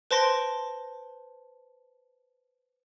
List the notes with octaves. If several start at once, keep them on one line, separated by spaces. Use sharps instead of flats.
B4 C5 A5 C6 A#6 D7